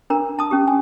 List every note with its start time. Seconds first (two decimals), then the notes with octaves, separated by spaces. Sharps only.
0.10 D4 A#4 A#5
0.39 A5 D#6
0.51 C#4 G4
0.68 G#5